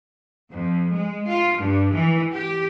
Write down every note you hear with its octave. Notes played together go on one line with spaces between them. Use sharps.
F2
G#3
F4
G2
E3
G4